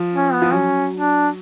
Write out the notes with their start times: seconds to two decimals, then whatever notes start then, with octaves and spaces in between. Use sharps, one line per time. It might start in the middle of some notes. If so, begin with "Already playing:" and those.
Already playing: F3
0.12 C#4
0.33 B3
0.42 F3
0.52 F#3 C#4
0.92 D4